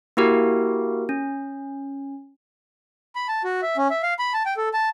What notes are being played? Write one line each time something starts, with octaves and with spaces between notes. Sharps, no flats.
A#3 E4 F#4 G4 A#4
C#4
B5
A5
F#4
E5
C#4
E5
F5
B5
A5
G5
A4
A5